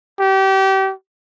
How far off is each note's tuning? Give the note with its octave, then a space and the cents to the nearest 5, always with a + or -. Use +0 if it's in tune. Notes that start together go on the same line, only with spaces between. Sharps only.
G4 -30